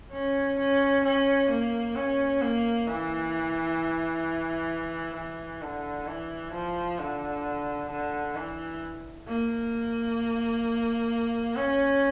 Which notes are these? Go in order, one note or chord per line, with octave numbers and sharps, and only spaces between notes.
C#4
C#4
C#4
A#3
C#4
A#3
E3
E3
D3
E3
F3
D3
D3
E3
A#3
C#4